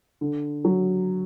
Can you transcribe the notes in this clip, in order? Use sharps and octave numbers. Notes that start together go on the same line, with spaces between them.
D3
F#3